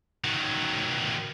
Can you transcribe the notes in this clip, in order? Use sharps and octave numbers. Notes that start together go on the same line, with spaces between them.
D#3 F#3